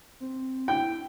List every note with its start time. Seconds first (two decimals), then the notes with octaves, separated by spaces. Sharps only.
0.20 C4
0.68 E4 G5